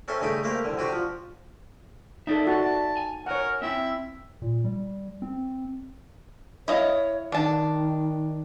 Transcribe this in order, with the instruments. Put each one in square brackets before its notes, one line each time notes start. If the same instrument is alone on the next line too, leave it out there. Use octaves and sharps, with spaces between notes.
[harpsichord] C4 C#4 A4 E5 C6
G2 C#3 A3 D#4 G5 B5
A3 A#3 G4 A#4 C5
C2 D3
C3 D4 F#4 G4
F3
[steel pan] D#4 A4 [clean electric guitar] D5 E5
[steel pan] F#4 [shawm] A5
[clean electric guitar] G#5
[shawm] A#4 [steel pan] C#5 F#5
[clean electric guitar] C4 E4 [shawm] E5
[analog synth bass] A#2
G3
C4
[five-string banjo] E4 D#5 F5 [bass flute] C#5
[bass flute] D#3 [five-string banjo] D4 A5